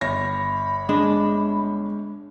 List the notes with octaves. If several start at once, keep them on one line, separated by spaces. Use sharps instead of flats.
G1 C#5 B5 A#6
G#3 D4